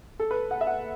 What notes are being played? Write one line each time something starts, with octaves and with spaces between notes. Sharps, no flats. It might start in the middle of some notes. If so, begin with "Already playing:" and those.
A4
B4
F#5
E5
F#5